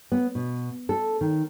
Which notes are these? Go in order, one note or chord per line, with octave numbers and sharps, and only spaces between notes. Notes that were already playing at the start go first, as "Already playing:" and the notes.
B3
B2
A4
D#3